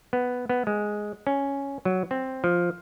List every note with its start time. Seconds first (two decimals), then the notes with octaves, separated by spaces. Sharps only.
0.13 B3
0.49 B3
0.67 G#3
1.27 C#4
1.85 F#3
2.11 C4
2.44 F3